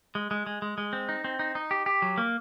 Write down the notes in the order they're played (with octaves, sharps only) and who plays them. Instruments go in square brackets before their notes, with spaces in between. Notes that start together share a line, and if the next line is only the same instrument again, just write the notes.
[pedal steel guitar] G#3
G#3
G#3
G#3
G#3
C4
D#4
C4
D#4
D#4
G4
G4
F#3
A#3